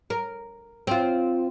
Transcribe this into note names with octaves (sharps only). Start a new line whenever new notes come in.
A#4
C4 F4